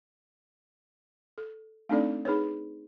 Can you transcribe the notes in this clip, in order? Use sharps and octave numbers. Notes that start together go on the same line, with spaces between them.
A4
A3 C4 D4 D#4 A4 D5
D#4 G#4 B4 C#5